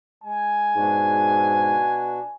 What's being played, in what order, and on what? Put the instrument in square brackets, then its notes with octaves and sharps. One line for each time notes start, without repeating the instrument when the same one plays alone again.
[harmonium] G#3 [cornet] G#5
[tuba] G#2 [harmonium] B2 D4 F#4